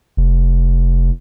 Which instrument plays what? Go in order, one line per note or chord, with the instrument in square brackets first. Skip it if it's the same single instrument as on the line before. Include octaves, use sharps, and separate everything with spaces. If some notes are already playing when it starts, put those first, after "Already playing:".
[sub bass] F1